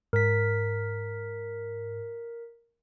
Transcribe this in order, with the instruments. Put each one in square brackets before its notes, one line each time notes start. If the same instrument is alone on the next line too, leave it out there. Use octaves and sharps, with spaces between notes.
[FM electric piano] G#2 [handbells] A#4 B6